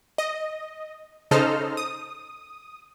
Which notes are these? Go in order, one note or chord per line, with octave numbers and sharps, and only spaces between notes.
D#5
C#3 D#4 A4 C5 D#5 F6
D#6